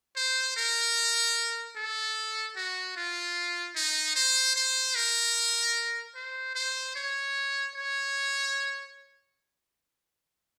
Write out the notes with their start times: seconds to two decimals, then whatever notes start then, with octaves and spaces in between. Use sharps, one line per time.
0.16 C5
0.57 A#4
1.76 A4
2.56 F#4
2.96 F4
3.76 D#4
4.16 C5
4.56 C5
4.95 A#4
6.15 C5
6.55 C5
6.96 C#5
7.75 C#5